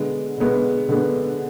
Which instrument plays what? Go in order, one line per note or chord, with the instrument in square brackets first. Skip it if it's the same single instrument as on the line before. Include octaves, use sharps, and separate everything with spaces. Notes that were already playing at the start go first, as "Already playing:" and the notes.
Already playing: [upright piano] D3 G#3 B3
D3 G#3 B3
D3 G#3 B3